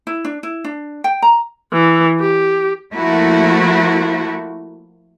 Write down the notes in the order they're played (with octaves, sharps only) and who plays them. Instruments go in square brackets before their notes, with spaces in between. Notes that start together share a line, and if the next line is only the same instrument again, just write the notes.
[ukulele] E4
D4
E4
D4
G5
A#5
[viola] E3
G4
[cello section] F3 A3 A#3 E4 F#4